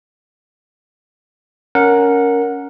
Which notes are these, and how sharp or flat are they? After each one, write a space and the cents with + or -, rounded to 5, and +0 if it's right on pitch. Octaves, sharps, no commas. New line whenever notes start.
C#4 +15 A#4 +0 F#5 -15